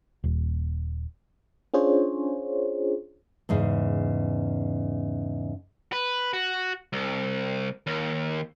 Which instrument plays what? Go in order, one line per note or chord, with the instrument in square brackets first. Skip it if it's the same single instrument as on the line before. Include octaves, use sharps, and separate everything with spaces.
[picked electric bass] D#1
[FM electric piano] C#4 D4 F4 G#4 C5 C#5
[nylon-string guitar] E2 G#2 C#3
[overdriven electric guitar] B4
F#4
C2
D#2